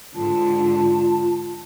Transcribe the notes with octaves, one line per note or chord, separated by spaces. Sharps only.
G#2 D3 F4 A5